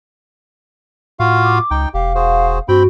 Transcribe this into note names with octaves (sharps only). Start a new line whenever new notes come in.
A2 F4 F#4 F5
D6
C#2 D#4 G5
E1 G4 F5
F#4 G#4 C5
G2 C4 F#4 G5 B5